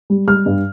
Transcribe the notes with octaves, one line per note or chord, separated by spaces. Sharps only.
G3
G3 F6
G2